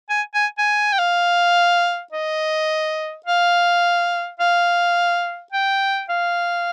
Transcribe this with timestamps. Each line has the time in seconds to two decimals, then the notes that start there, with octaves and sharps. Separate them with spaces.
0.10 G#5
0.34 G#5
0.58 G#5
0.92 G5
0.99 F5
2.13 D#5
3.26 F5
4.40 F5
5.52 G5
6.09 F5